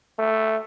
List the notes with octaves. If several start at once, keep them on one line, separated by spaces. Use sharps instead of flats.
A3